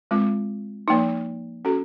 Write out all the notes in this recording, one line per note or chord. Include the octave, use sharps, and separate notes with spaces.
G#3 C4 F4
F3 A#3 D#4
C#4 F#4 A4